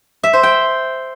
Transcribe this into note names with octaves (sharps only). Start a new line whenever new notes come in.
E5
C5
G5